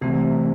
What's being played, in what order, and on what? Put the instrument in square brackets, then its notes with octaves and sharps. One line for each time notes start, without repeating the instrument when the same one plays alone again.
[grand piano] C2 C3 [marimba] E3 A3 C4